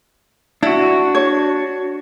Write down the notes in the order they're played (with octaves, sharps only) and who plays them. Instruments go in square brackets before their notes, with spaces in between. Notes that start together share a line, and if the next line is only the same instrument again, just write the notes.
[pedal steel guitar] D4 F#4 [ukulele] E4
[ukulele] C#5